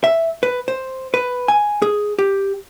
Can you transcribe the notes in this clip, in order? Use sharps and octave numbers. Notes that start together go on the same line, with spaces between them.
E5
B4
C5
B4
G#5
G#4
G4